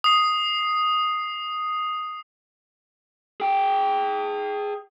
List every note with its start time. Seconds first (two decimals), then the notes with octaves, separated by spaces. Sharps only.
0.04 D#6 C7
3.40 G#4 G5